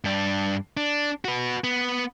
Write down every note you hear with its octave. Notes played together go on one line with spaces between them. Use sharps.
G2 D4
D4
F#4 B4
B3